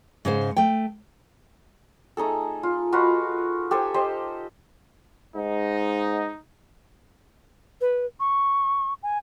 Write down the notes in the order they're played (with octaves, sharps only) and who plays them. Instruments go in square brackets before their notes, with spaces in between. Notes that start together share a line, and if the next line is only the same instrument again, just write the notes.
[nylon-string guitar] G#2 C#3 C#4 C5
A3 G5
[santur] A3 D#4 G#4 A4
F4
F4 F#4 B4 D#5
G4 A4 C5 G#5
G4 C5 D#5
[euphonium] G#2 [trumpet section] D#4
[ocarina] B4
C#6
G#5